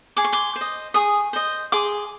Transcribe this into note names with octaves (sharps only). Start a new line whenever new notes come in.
G#4 D6
C#6
C6 D6
C5
D#5
G#4 C#6 D#6
C5 D#5
G#4 C6 D6